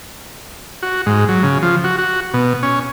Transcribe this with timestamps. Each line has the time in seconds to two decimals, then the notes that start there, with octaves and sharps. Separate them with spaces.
0.83 F#4
1.06 G#2
1.29 F#3
1.43 C#3
1.62 F3
1.84 F#4
1.98 F#4
2.34 B2
2.63 C#4